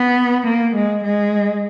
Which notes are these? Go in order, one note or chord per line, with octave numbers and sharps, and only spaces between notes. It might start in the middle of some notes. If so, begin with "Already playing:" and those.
Already playing: B3
A#3
G#3
G#3